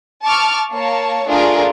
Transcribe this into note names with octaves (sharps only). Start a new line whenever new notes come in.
A5 C#6 D6 F6
A#3 C#5 A5
A3 D4 F4 G#4 A#4